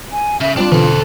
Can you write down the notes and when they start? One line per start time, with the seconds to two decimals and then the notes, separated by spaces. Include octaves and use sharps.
0.12 G#5
0.41 C#3 E5
0.57 G3 C4 D4 F4
0.72 B2 D3 E3 A4 C5